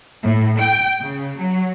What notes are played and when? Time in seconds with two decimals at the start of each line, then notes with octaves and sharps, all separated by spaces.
0.23 A2
0.60 G5
1.00 C#3
1.37 F#3